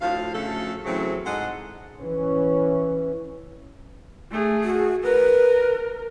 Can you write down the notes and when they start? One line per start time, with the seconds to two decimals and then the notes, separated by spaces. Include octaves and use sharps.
0.01 D2 A2 F3 F5
0.34 D2 C#3 F3 A3 A4
0.85 A2 C#3 E3 F#3 C4
1.26 G#2 G#3 A4 C5 D#5 F#5
2.01 E3 C#4
4.32 A3 G#4
4.64 F#4
5.03 A#4 B4